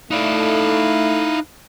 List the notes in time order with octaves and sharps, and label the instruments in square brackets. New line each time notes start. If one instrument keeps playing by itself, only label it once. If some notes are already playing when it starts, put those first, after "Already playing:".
[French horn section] A3 [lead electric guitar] D#4 D5 [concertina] E4 F5 F#6